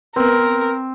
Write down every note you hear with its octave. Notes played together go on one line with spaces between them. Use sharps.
B3 C4 A#4 B4